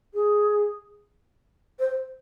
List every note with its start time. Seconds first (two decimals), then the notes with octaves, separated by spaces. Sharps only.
0.14 G#4
1.79 C5